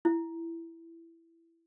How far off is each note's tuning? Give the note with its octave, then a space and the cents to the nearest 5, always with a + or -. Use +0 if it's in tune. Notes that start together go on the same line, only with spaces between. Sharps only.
E4 +10